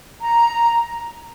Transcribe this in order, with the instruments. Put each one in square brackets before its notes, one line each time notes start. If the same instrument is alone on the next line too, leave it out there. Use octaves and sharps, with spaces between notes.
[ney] A#5